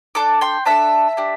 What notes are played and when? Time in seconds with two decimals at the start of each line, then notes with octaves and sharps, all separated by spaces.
0.15 D4 A4 A5 D6
0.41 G5 C6
0.65 D4 A4 E5 A5
1.17 D4 G4